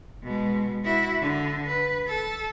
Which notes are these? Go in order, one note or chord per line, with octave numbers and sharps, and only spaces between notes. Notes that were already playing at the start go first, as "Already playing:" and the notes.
B2 G#3
E4 F#4
D3
B4
A4